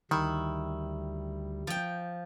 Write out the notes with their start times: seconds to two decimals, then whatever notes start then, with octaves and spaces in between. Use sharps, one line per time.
0.11 D2 D#3 G3 E4
1.67 F3 G5